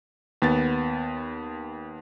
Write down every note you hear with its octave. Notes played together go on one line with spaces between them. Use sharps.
D#2 B3 A6